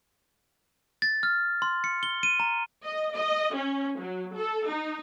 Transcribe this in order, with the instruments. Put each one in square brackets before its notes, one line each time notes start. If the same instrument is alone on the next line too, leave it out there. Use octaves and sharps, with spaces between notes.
[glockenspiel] A6
F6
C6
C#7
G7
D#7
A#5
[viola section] D#5
D#5
C#4
F#3
A4
D#4